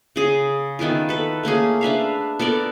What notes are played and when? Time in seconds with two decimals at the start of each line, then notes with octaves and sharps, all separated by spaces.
0.16 C#3 G#4
0.79 D#3 B3 E4 F4
1.09 A4 B4
1.43 A3 A#3 C#4 G#4
1.81 D4 B4 E5 F5
2.39 B3 A4 A#4 D5